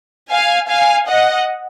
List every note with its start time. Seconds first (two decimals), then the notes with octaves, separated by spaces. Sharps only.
0.31 F5 G#5
0.69 F5 G#5
1.08 D#5 F#5